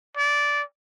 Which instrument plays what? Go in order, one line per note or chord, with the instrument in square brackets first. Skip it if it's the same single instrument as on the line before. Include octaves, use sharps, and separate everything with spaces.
[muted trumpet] D5